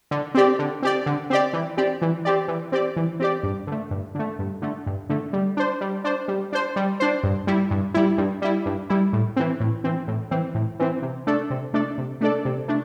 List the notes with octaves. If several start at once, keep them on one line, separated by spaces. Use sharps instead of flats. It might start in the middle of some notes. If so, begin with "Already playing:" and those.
D3
C4 G4 D5
D3
C4 G4 D5
D3
C4 G4 D5
E3
C4 G4 D5
E3
C4 G4 D5
E3
C4 G4 D5
E3
C4 G4 D5
G2
D3 A3
G2
D3 A3
G2
D3 A3
G2
D3 A3
G3
D4 C5
G3
D4 C5
G3
D4 C5
G3
D4 C5
G2
G3 E4
G2
G3 E4
G2
G3 E4
G2
G3 E4
A2
E3 C4
A2
E3 C4
A2
E3 C4
A2
E3 C4
C3
A3 D4 A4 D5
C3
A3 D4 A4 D5
C3
A3 D4 A4 D5
C3
A3 D4